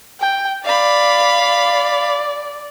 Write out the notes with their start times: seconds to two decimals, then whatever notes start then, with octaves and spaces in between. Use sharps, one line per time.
0.20 G5
0.64 D5 F5 B5
1.42 D5